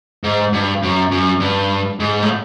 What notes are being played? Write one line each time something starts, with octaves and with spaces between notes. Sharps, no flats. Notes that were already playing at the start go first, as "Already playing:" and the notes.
G#2
G2
F#2
F#2
G2
G#2
A2